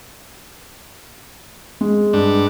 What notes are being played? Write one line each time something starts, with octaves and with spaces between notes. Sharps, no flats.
G#3
G2 D4